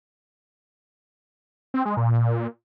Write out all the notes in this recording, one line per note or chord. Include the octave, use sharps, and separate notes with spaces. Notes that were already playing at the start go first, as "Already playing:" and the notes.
C4
G#3
A#2